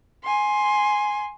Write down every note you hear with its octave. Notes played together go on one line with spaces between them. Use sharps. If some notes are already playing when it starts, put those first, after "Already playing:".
G#5 C6